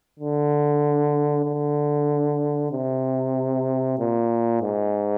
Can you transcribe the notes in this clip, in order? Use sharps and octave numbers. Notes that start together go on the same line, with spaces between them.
D3
D3
C3
A#2
G#2